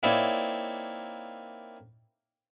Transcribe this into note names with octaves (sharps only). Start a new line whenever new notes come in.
A#3 C4 D#4 E4 C#5 D5